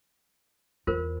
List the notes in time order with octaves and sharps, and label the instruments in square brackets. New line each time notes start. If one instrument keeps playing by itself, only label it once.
[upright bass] E2 [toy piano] F4 A#4 C5